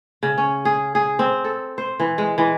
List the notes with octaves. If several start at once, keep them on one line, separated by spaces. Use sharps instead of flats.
C#3
C#4
G#4
G#4
C4
A4
C5
E3
G#3
E3